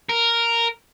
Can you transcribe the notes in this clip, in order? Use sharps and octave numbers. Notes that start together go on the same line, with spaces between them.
A#4